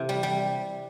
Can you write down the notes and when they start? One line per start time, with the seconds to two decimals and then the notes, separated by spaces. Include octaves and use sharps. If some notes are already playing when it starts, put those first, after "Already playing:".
Already playing: C3 E3 E4
0.09 G3
0.23 G3